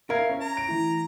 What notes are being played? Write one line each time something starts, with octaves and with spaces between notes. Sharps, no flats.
A#4 E5 F5 G#6
C#4
A#5
D7
E3 A3 E4